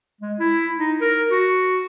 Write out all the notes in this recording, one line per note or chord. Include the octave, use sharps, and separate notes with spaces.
G#3
E4
D#4
A#4
F#4